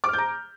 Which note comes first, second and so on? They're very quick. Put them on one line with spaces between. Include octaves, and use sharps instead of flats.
D6 F6 G6 A#5